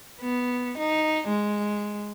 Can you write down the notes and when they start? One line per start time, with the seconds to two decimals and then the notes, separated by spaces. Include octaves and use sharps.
0.21 B3
0.78 D#4
1.29 G#3